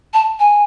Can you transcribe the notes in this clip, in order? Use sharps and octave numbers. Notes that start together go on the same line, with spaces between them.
A5
G#5